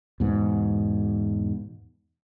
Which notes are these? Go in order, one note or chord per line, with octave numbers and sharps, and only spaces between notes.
E2 G#2 B2